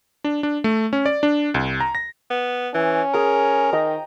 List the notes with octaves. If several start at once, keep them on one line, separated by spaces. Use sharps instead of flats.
D4
D4
A3
C#4
D5
D4
C2
A#5
A#6
B3
E3 C#4
G#4 A#4
D#3 D#5 G5 A#5